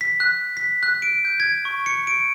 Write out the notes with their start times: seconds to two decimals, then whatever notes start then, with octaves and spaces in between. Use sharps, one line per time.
0.01 B6
0.20 F#6
0.57 B6
0.83 F#6
1.02 D7
1.25 G6
1.40 G#6
1.65 C#6
1.86 C#7
2.07 D7